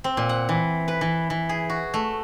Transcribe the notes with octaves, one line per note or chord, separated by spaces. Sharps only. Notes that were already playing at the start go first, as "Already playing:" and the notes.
C4
A#2
F#5
E3
B4
E3
E3
G#4
F#4
A3